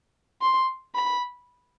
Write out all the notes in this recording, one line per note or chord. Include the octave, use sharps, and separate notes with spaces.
C6
B5